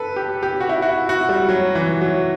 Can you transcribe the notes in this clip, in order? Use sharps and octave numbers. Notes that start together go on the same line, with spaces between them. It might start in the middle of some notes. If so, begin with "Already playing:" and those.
Already playing: A4 B4
G4
G4
F#4
E4
F#4
E4
F#4
G3
F#3
E3
F#3